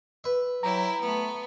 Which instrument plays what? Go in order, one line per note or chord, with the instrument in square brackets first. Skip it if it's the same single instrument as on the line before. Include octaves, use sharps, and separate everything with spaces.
[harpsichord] B4 E5
[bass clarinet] F#3 [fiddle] E4 G4 [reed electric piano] A#5
[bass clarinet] A3 [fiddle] B3